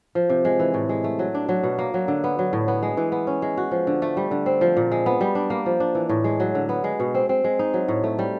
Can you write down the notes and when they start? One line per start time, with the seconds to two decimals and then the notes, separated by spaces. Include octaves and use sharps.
0.15 F3
0.29 C3
0.45 G#3
0.59 E3
0.74 A2
0.89 G#3
1.04 A3
1.19 F#3
1.34 D4
1.49 F#3
1.63 B2
1.78 A#3
1.94 F#3
2.08 D3
2.24 B3
2.39 F#3
2.53 A2
2.68 B3
2.83 G#3
2.97 E3
3.12 B3
3.27 C#4
3.42 G#3
3.57 F#4
3.71 F3
3.87 D3
4.02 A3
4.17 G3
4.31 D3
4.46 C4
4.61 F3
4.77 A#2
4.91 G#3
5.06 B3
5.21 G3
5.35 D4
5.50 A#3
5.66 F3
5.80 D4
5.95 E3
6.09 A2
6.24 G#3
6.40 F#3
6.55 D3
6.69 B3
6.84 G#3
7.00 B2
7.15 C4
7.29 C4
7.44 G#3
7.59 D#4
7.74 F#3
7.88 A2
8.04 A3
8.19 G3